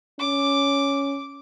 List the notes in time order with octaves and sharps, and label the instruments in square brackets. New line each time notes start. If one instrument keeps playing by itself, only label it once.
[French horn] C#4 [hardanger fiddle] D6